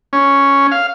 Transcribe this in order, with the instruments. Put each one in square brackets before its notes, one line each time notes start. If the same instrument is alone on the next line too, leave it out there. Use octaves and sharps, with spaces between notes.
[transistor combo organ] C#4
F5